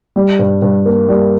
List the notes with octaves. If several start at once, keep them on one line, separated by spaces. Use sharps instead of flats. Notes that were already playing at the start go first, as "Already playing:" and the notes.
G3
G2
G2
A#3
G3